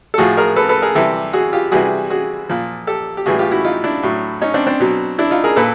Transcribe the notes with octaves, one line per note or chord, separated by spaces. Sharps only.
A4
A2 F3 F#4 G#4
G#4 A#4
A4 B4
A4 B4
G#4 A#4
C3 E3 G3 G4 A4
F#4 G#4
F4 G4
C3 E3 G3 F#4 G#4
F#4 G#4
A#2 F3
G4 A4
G4
A2 E3 G3 F#4 G#4
F4 G4
E4 F#4
D#4 F4
D4 E4
A2 F#3
C#4 D#4
C4 D4
C4 D4
B2 F#3
D4 E4
D#4 F4
G#4 A#4
A#2 A4 B4